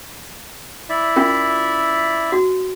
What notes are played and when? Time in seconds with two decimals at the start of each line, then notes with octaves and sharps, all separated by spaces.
0.89 E4 D5 E5
1.16 C#4 F4 A#4
2.32 F#4